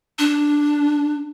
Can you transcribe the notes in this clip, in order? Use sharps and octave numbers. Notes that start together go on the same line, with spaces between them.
D4